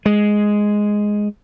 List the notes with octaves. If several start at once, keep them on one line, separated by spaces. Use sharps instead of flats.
G#3